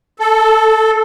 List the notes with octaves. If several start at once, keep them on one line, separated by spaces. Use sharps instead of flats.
A4